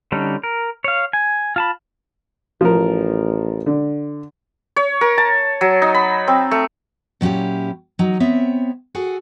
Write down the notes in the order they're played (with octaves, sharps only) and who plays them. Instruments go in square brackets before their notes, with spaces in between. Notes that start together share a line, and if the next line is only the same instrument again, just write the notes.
[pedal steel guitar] D3 G3 C#4 D#4
A#4
C#5 F5
G#5
F4 A5 B5
[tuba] A1 [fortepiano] F3 A#4
[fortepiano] D3
[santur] C#5
A#4
A5
F#3
D#4
B5
C4
A3
[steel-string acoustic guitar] A#2 F#3 C#4 E4 G4
F#3 D#4
B3 C4 C#5 E5
F#4 G#4 A4